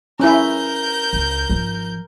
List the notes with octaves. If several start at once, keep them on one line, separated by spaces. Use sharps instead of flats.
C#4 E4 A#4 G6
C#2
G#1 F3